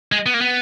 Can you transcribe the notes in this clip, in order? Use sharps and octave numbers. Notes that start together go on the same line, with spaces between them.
G#3
B3
A#3
B3